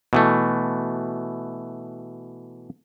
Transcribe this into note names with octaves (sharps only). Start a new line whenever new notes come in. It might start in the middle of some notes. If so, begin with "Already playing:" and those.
B2 E3 A3